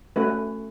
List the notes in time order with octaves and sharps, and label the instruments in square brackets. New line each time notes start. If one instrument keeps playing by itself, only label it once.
[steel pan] A3 C#4 F#4 B4